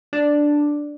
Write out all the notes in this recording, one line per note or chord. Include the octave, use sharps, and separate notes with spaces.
D4